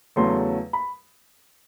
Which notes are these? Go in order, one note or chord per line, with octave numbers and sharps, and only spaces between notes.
E2 C#3 F#3 A3 C6
B5